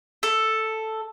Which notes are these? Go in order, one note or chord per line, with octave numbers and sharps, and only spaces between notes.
A4